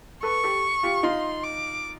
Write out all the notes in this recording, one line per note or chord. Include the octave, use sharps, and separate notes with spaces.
A4 B4 C#6
G4 A4
F4 G4
D#4 F4 C6
D6